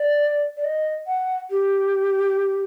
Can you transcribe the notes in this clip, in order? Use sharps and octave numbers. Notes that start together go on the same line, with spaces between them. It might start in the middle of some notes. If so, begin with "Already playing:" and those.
Already playing: D5
D5
D#5
F#5
G4